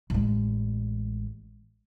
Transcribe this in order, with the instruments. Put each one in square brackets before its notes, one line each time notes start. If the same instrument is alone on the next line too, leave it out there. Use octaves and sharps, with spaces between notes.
[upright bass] A1 G#3